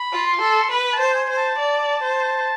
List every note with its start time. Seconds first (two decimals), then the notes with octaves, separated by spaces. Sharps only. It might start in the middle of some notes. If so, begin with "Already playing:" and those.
Already playing: B5
0.12 F4
0.26 C6
0.41 A4
0.71 B4 B5
0.93 A5
1.00 C5
1.15 G#5
1.30 C5
1.37 A5
1.58 D5
2.03 C5